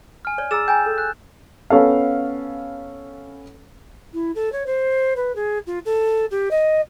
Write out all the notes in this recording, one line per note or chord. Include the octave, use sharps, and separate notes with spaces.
G#5 F6
C#5 D5
G#4 A#5 E6 A6 E7
G5 G#5 A#5 G6
A4
F#6
B3 C#4 A4 F5
E4
A4
C#5
C5
B4
G#4
F4
A4
G4
D#5